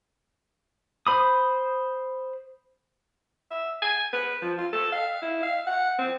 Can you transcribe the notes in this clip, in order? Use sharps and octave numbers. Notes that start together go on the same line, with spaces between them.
C5 B5 D#6
E5
G#5
B4
F3
F4
A4
F5
E4
F5
F#5
C4